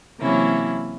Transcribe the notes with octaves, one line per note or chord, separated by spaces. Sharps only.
C3 E3 F#3 A#3 C#4 E4